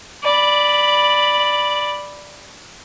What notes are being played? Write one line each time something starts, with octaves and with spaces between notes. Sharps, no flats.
D5 B5